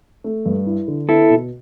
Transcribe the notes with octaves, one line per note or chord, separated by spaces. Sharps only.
A3
G2
E4
D3
B3 E4 A4
B2